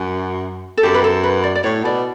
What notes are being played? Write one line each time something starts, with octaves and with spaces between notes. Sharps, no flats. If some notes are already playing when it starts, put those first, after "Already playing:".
Already playing: F#2
A4
F#2 G4
B4
A4
B4
D5
D5
A2 C#5
B2 D5